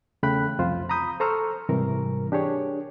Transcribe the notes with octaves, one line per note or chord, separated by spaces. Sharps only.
E2 C#3 A3 G5 B5 F#6
C2 F2 F4 C5
A#5 B5 D#6 G6
A4 C5 A#5 C#6 E6 F6
G#2 C3 E3 G3 A#4
D4 G4 G#4 C#5